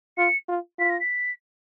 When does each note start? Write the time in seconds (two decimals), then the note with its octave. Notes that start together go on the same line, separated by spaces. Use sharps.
0.18 F4 C#7
0.49 F4
0.79 F4 B6
0.90 A#6
1.00 B6